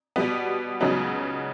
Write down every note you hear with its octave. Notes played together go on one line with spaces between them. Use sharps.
B2 G3 B3
C#2 C#3 F#3 B3 D#4